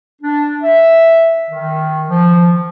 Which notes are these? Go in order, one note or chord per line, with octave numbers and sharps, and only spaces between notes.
D4
E5
D#3
F3